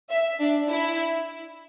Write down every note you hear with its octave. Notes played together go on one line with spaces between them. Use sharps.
E5
D4
E4